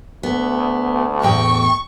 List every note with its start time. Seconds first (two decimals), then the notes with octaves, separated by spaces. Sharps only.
0.23 D2 B3
1.22 E2 A2 G5 C#6